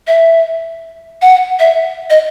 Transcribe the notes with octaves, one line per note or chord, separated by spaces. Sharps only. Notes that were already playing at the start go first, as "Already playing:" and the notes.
E5
F#5
E5
D#5